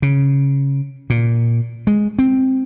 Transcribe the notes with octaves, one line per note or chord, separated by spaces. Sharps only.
C#3
A#2
G#3
C4